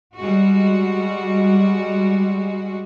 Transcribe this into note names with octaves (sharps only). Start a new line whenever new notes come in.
G3 G#3 F#4